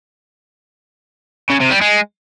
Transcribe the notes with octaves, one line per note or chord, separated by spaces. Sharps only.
C#3
C3
G3
G#3